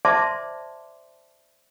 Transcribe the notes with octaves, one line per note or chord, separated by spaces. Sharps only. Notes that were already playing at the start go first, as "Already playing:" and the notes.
C5 D5 E5 A5 C6 D6